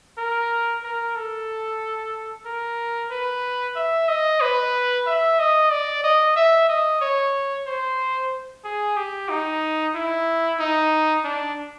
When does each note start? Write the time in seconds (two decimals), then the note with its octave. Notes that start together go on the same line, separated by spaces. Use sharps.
0.18 A#4
0.84 A#4
1.16 A4
2.46 A#4
3.11 B4
3.76 E5
4.08 D#5
4.41 B4
5.07 E5
5.39 D#5
5.72 D5
6.04 D#5
6.36 E5
6.69 D#5
7.01 C#5
7.66 C5
8.64 G#4
8.97 G4
9.29 D#4
9.95 E4
10.59 D#4
11.24 D4